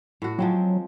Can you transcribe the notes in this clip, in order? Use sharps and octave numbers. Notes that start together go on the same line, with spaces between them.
A2 F#4
F3 F#3 G#3 C4